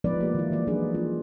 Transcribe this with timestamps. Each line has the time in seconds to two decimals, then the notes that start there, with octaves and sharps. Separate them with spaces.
0.04 F3 G#3 B3 D#4 B4 D5
0.21 A#3 G4
0.35 D#3 E4
0.51 D#3 E3 G#3 A#3 F4 D5
0.67 F#3 D4 D#4 G#4 B4
0.95 C#4 F4